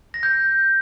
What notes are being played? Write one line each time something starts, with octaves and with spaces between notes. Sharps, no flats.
A#6
G6